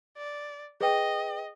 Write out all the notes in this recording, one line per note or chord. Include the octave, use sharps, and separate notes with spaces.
D5
G#4 B4 D#5 G5